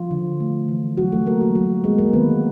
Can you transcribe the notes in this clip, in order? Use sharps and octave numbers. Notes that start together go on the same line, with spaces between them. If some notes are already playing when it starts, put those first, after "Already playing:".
Already playing: F3 F4
D3
A3
E3
E3 F#3 F#4
A3 A4
A3 A#3 A#4
F#3 F#4
F#3 F#4
G#3 B3 G#4
A#3 A#4
D#3 B3 B4